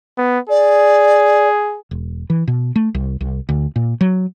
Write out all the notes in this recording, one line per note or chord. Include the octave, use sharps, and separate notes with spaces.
B3
G#4 D5
E1
E3
B2
A3
C2
C2
D2
A#2
F#3